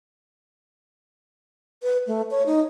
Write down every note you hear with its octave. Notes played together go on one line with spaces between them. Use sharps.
B4
A3
C#5
D#4